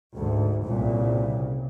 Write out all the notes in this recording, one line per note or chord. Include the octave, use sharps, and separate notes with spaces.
D2 G#2
C2 A#2 C#3